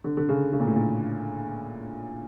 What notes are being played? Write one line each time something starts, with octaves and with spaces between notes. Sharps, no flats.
D3
D3
C#3
C#3
A#2
A2
A#2